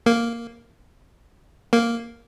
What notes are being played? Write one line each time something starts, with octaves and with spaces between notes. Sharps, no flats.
A#3
A#3